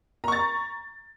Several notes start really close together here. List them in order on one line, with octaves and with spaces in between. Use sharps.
A#5 C#6 A6